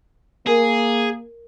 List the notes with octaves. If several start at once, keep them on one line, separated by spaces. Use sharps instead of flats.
A#3 G#4 A#4